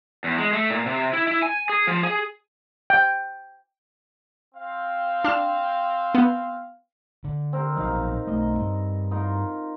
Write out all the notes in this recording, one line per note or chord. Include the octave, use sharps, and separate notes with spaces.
E2
G#3
A3
A#2
C3
E4
E4
G#5
G#4
F3
G#4
G5
C4 F5
D4 F6 E7
B3
D3
C4 A#4
A#1 F#3 D#4 F5
B1 A3 D#5
G2
D#4 F4 A#4